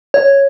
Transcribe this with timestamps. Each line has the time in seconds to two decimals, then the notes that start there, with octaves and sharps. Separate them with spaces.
0.14 C#5